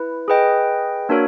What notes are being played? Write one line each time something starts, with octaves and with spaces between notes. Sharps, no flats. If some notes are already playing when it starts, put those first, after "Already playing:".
Already playing: E4 B4
G#4 B4 D#5 G5
A#3 D4 F#4 A#4 C#5